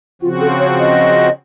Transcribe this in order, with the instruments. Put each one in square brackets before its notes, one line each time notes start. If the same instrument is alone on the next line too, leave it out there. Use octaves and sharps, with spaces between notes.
[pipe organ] C#3 F3 C4 F#4 [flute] F4
[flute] A4
C#5
D#5